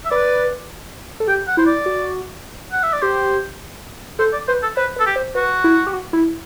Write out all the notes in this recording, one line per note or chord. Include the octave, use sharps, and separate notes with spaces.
E5
B4 D5
A4
G4 G5
F#5
E4 C5
D5
F#4
F#5
E5
D5
G4 C5
A4 C5
D5
B4 C5
A4
B4 C5
B4
A4
G4
C5
F#4 B4
E4
G4
F#4
E4